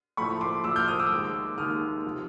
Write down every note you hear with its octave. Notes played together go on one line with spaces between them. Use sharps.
A2 F3 A3 B5 C#6
C6 D6
A2 F3 A3 D6 E6
F6 G6
D#6 F6
D6 E6
D#2 D#3 G#3
D#2 D#3 G#3 D#6 F6
C3 F3